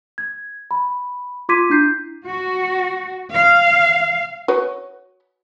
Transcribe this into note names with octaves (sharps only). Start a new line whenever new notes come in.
G#6
B5
F4 C6 D6 G#6 B6 D#7
D4 E4 G6 C7
F#4
F5
F#4 B4 C#5